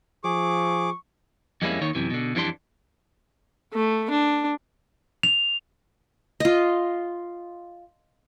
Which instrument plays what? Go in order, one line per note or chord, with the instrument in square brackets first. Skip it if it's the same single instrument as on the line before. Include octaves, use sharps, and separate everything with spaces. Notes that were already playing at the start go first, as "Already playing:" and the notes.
[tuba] F3 [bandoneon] G#4 D6 [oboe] C#6
[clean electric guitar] F2 G3 G#3 A#3 C#4 E4
D#2 D#3 C#5
F#2 C3 E3
B2 D3
F2 E3 G3 D4 C6
[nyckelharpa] A3
D4
[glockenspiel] F7
[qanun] F4 D#5